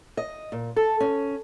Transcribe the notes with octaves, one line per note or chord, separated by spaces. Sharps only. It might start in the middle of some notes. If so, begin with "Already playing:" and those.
D#5
A#2
A4
C#4